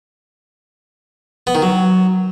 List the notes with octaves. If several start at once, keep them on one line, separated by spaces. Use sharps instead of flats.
B3
D#3
F#3